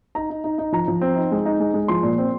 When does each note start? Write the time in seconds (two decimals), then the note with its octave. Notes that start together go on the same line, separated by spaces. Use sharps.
0.15 D#4 A#5
0.30 D#4
0.44 D#4
0.58 D#4
0.73 F3 A#5
0.88 F3
1.01 C4
1.16 D#4
1.32 G#3
1.46 D#4
1.60 G#3
1.74 G#3
1.88 F3 C6
2.03 A#2
2.18 C4